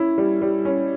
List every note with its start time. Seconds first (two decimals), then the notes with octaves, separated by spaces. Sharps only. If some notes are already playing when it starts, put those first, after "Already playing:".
Already playing: C#4 E4
0.18 G3
0.42 G3
0.65 C#4